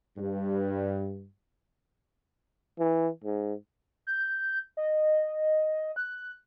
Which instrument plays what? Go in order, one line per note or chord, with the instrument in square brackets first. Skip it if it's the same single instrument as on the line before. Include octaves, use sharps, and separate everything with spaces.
[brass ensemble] G2
[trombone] E3
G#2
[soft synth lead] G6
D#5
F#6